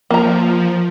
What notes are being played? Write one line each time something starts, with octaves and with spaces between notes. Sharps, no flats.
F3 A#3 A#5